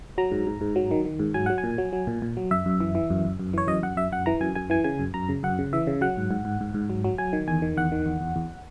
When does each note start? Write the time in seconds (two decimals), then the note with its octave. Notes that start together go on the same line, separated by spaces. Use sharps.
0.18 F#3 A#5
0.32 G#2
0.47 G#2
0.61 G#2
0.76 F#3
0.91 D#3
1.05 D#3
1.20 G#2
1.34 F#3 G#5
1.46 F#3 F#5
1.58 G#5
1.64 A#2
1.78 F#3
1.93 F#3
2.07 A#2
2.22 A#2
2.37 F#3
2.51 F#2 E5
2.66 F#2
2.80 E3
2.95 E3
3.10 F#2
3.25 F#2
3.40 F#2
3.53 E3 C#5
3.68 F#2 D#5
3.83 F#2 F#5
3.97 F#2 E5
4.12 F#2 F#5
4.26 E3 A#5
4.41 F#2 G#5
4.55 F#2 G#5
4.70 E3 G#5
4.84 C#3 G#5
4.99 F#2
5.14 F#2 A#5
5.29 C#3
5.43 F#2 F#5
5.59 C#3
5.73 E3 E5
5.87 C#3
6.01 F#3 F#5
6.17 G#2
6.31 G#2
6.45 G#2
6.61 G#2
6.74 G#2
6.90 F#3
7.05 F#3
7.18 F#3 G#5
7.33 D#3
7.48 E2 G#5
7.62 D#3
7.77 E2 F#5
7.92 D#3
8.06 E2
8.21 E2
8.36 E2